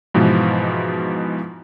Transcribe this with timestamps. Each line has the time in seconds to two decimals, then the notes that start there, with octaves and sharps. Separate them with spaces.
0.14 G#2 B2 E3 F3